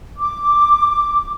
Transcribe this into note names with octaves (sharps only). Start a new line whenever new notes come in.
D6